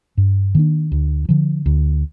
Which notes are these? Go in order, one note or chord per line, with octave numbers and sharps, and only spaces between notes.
G2
D#3 A#3 D4
D2
D3 F3
D2